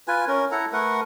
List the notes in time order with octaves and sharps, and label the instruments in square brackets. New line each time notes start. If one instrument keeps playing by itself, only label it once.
[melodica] F4 B4 G#5
C#4 A#4
E4 A4 F#5 A#5
A3 A#4 B4 F#5